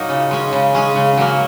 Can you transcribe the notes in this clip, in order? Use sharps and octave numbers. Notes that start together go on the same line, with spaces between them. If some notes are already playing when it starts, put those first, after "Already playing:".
Already playing: A#2 F#3 A#3 D#4
C#3
G#3 C#4 G#4
C#3
G#3 C#4 G#4
C#3
F#3 A#3